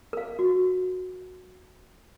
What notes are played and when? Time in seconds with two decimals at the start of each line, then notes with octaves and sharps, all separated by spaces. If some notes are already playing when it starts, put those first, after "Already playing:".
0.13 A#4 F5
0.39 F#4